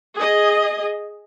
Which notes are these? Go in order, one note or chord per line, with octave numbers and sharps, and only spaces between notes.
G#4 D#5